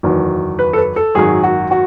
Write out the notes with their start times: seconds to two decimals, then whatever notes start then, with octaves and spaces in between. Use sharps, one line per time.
0.03 F#1 E2 D#3 F#3
0.59 B4
0.73 A4
0.78 B4
0.96 A4
1.15 G#1 F#2 D#3 F#3 G#4
1.43 F#4
1.71 F#4